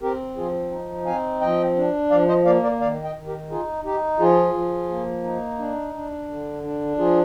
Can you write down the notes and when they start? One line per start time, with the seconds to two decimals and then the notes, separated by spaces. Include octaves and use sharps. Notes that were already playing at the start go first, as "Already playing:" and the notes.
0.02 C4 G4 A#4
0.36 F3 F4 G#4
0.71 D#4
1.06 C4 F5 G#5
1.41 F3 D#5 G5
1.76 D4
2.10 F3 D5 F5
2.28 C5 D#5
2.45 A#3 D5 F5
2.63 A#4 D5
2.81 D#3 D5 F5
3.04 D#5 G5
3.16 D#3
3.27 G4 A#4
3.50 D#4 F4 G#4
3.85 D#4 G4
4.19 F3 F4 G#4
4.54 F3
4.89 A#3
5.24 D#4
5.58 D4
5.94 D4
6.28 D3
6.64 D4
6.98 F3 F4 G#4